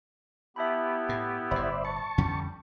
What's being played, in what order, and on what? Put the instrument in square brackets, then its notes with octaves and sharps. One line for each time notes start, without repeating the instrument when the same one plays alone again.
[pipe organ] B3 E4 G4 [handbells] E5 A5 B5
[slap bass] A2
[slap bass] G1 A2 [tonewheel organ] C5 D5 E5 [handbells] B5
[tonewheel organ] A5 C#6 [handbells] C#7
[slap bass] F2 D3 C#4 [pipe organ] G3